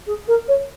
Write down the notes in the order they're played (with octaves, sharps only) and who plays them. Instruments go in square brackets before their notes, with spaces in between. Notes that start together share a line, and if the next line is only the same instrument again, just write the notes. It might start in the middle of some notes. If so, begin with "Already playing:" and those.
[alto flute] G#4
A#4
C#5